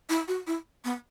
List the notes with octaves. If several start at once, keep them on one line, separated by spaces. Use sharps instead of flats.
E4
F#4
E4
B3